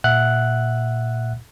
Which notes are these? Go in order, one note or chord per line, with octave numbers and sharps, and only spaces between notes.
A#2 E5 F#5 F#6